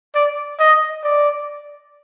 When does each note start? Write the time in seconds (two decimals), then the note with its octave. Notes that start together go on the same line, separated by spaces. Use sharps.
0.15 D5
0.59 D#5
1.04 D5